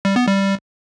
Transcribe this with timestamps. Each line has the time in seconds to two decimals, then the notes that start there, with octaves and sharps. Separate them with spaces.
0.05 G3
0.16 B3
0.27 G3